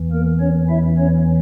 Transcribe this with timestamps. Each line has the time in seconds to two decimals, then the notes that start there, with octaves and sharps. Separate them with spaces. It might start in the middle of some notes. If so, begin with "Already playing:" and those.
Already playing: E2 E3
0.11 A#3 A#4
0.40 C#4 C#5
0.69 E4 E5
0.98 C#4 C#5